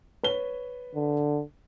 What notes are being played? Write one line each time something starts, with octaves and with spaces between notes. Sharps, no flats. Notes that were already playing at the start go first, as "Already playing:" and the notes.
B4 C#5 G7
D3